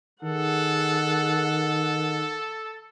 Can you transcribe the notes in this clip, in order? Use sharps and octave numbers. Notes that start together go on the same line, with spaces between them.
D#3 G#4 A4 F#5